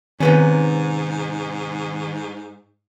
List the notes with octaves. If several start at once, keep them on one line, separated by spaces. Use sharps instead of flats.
G#2 C3 D#3 B3 C#4